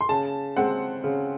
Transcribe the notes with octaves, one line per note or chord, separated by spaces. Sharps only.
C6
C#3 A5
G#3 C4 F#5
C#3